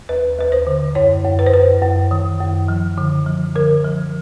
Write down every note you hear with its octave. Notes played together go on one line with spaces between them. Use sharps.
D#2 B4
D#2 B4
C5
D3
F#2 C#5
F#2
B4
C5
F#2 B4
F#2
D#3
F#2
F3
D3
F3
D3 A#4
F3